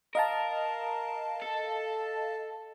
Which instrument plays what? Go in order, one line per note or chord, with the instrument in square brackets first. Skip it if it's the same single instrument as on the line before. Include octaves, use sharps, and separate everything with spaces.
[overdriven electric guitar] A#4 [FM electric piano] D#5 F5 A5
[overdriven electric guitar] A4